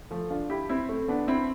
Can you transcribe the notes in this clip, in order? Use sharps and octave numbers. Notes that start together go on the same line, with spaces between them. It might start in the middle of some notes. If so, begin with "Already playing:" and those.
F3 A3
D4 F4
E4 G4
C4 E4
A3 C4
B3 D4
C4 E4